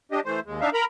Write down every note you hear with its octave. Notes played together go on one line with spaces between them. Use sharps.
D4 G4 D#5
E3 A3 C5
D#2 G#3
D4 D#4 E5 F5
A#4 A#5 B5